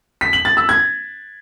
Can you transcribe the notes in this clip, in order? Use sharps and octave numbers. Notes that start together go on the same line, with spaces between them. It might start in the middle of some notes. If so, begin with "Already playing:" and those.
B6
F#7
A6
E6
G#6